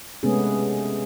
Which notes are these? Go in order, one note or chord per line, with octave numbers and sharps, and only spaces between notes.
C3 G#3 A3 B3 C#4 G#4